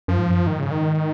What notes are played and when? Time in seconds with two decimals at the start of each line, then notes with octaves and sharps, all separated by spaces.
0.08 F#2 F3
0.18 G#2
0.28 F#2
0.47 G#2 D#3
0.59 C#3
0.71 D#3